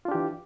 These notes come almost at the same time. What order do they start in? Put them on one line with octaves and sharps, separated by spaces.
F4 D4 G4 E3